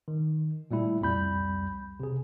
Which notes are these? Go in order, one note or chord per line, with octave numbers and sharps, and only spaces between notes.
D#3
A#2 G3 A3 E4
C2 F2 G3 B5 G6
C3 G#4